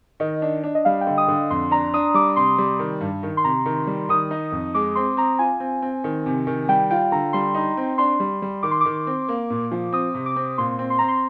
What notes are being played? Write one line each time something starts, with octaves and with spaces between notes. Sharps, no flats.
D#3 D#5
D4
D4
D#5
G3 F5
G5
D3
D#6
D3
F2 C6
D4 A#5
D4 D#6
G3 D6
C3 C6
G3
D#3
G2
D#3
C6
C3 A#5
D#3
G3
D#3 D#6
D#4
F2
G#3 D6
C4 C6
C4 A#5
F4 G#5
C4
C4
D#3
C3
D#3
G3 G5
F4 G5
D3 A#5
G3 C6
D#4
C4
D4 C6
G3
G3
D#3 D6
C6
D#3 D6
C4
A#3
A#2
F3
C4 D#6
C3
D6
C4
A#2 C6
C4
C6
C4 A#5
C6